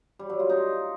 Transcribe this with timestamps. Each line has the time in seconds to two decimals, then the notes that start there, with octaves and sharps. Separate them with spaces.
0.19 G3
0.29 F#3
0.39 F4
0.49 D#4